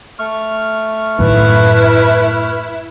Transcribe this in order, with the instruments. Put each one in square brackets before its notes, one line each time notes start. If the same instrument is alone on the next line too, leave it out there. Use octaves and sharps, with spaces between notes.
[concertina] A3 C#6 F6
[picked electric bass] F#2 A2 D#3 [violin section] E4 [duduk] B4